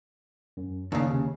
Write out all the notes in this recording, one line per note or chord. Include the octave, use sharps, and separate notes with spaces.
F#2
D#2 C#3 D4 D#4 F5
C3 C#4